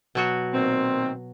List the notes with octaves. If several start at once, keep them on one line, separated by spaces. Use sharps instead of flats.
B2 F#3 F#4
A#2 D#3 C4